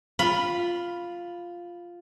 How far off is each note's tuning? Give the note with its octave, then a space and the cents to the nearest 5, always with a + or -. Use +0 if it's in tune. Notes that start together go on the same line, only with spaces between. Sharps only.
F4 +0 B5 +0